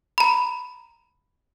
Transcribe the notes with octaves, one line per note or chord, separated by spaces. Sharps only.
A#5 B5